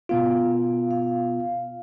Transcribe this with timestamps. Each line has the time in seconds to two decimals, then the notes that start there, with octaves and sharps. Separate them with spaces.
0.09 B2 B3 F4 F5
0.91 F5